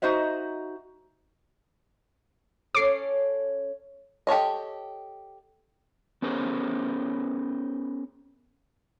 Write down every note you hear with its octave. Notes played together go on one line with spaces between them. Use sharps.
D#4 F#4 C5 D#5 E5
C#4 A4 C#5 D6 C7
G4 A4 C#5 D#5
B3 C#4 G#4 A#4 C5